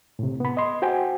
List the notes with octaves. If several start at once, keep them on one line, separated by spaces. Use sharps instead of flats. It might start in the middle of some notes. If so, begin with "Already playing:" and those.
A2 C3
B3 B5
D#5 C6
F#4 C5 G5 G#5